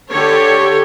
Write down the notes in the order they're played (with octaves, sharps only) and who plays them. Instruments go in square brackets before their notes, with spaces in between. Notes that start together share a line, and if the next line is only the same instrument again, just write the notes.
[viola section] D3 G4 A4 C#5